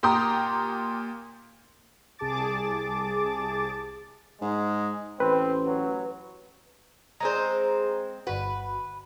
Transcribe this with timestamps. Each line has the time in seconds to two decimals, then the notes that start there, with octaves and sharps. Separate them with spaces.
0.03 A#2 G4 A#5 C6 D#6
2.18 C2 G#4 A5 D6 A6
4.42 G#2 G#3
5.20 A1 C4 B4
5.66 F#3
7.20 G#3 C4 G#4 C5 A#5
8.27 G1 F#4 B4